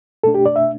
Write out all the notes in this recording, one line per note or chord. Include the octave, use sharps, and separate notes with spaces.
B2 A3 D4 A4
G4
D5
E5